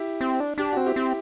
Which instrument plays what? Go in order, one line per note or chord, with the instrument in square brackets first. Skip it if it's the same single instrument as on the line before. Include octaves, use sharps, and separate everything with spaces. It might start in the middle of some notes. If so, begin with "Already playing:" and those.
Already playing: [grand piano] E4 G4
[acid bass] C4
D4
[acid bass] D4 [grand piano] G4
[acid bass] C4 [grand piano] F#4
[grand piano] E4 G4
[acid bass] C4